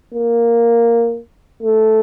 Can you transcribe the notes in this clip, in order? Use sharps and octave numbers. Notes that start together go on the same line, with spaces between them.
A#3
A3